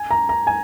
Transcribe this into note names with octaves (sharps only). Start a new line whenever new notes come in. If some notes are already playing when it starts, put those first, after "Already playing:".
Already playing: G#5
A#5
A#5
G#5